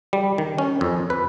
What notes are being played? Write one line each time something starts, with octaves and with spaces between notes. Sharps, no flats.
G3
D#3
C#4
F2
B4